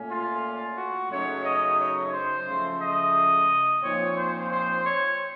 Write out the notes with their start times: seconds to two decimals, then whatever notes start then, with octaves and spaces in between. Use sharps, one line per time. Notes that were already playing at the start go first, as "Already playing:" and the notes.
Already playing: A#2 A3 C#4
0.09 F4
0.77 F#4
1.10 F#2 C#3 A3 D#4 C#5
1.45 D#5
1.79 C#5
2.13 C5
2.47 C#3 F3 A3
2.81 D#5
3.83 A#2 F3 C4 D#4 C#5
4.17 C5
4.51 C5
4.85 C#5